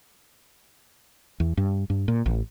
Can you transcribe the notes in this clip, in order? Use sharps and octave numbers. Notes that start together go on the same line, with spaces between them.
E2
G2
G2
A#2
A1